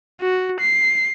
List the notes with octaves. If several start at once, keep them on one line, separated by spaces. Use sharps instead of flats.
F#4
C7